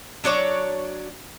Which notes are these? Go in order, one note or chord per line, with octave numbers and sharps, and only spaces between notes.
F#3 D4 C#5 D5